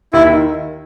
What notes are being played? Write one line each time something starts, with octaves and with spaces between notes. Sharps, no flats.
D#2 E4
D#3